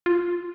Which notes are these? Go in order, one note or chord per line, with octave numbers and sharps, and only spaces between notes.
F4